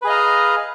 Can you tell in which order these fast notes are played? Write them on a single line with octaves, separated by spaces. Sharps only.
B4 G#4 D#5 F5 A#5